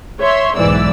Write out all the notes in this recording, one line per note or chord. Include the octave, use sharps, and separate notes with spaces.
C#5 E5 C6
B1 G#2 E3 D5 E6